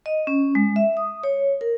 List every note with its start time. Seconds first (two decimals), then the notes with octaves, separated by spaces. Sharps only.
0.06 D#5
0.27 C#4
0.55 G#3
0.76 E5
0.97 D#6
1.23 C#5
1.61 A#4